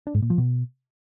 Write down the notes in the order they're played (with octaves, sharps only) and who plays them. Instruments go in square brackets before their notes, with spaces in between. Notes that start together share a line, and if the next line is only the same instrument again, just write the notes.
[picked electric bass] D4
G#2
A#2
F3
B2